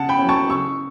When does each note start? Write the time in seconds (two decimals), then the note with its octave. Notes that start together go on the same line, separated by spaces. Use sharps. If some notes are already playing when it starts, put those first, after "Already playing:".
Already playing: C#3 F#5 A5
0.09 G5 B5
0.19 F#3 C#4
0.29 A5 C#6
0.49 C#3 C#6 E6